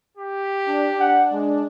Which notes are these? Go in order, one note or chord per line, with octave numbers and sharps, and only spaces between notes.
G4
D4
F#5
G#3